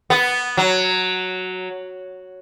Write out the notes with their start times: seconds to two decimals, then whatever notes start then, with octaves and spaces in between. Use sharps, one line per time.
0.10 B3
0.57 F#3